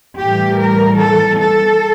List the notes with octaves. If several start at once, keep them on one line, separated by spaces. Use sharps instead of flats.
A2 E3 G3 G4
A#4
A4
A4